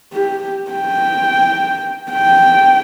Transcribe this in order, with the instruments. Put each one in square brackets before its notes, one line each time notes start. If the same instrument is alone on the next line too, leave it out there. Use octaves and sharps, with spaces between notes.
[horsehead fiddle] G4
G5
G5